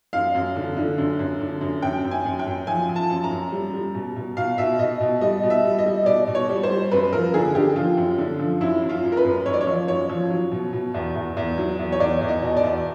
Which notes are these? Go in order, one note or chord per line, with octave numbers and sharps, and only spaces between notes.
F#2 F5
F#2
D3
D3
F#2
F#2
D3
F#2
F#2 G5
F#2
G#5
F#2
G5
F#2
F3 G#5
F3
A5
F#2
A#5
F#2
G3
G3
B2
B2
B2 F5
B2 E5
B2 D#5
B2
G3 D#5
B2
E5
G3
D#5
G3
B2 D5
B2
C#5
G3
C5
G3
F#2 B4
F3 A#4
D3 G#4
D3 G4
F3 F4
F#2
D3
F3
F#2 E4
F#2
F4
F#2
A#4
B4
F#2
F#2 C#5
D5
C#5
F3
F#2 C#5
F3
F#3
B2
B2
E2
E2
E2
F#3
E2
C#5
E2 D5
E2
D#5
B2
D5
E2